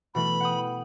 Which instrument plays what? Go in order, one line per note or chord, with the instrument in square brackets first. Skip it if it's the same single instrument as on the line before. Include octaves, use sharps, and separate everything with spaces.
[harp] B2 E3 A3 [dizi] B5
[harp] F#5 G5 D#6